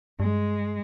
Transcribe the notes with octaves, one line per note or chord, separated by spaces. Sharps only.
G2 G#3